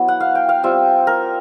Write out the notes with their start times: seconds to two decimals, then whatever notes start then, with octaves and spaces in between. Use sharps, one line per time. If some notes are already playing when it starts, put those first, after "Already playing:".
Already playing: F#3 B3 E4
0.08 F#5
0.20 F5
0.35 G5
0.49 F5
0.63 G3 C4 F4 E5
1.07 A#4